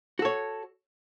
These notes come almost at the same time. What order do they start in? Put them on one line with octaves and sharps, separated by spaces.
F#4 A4 C#5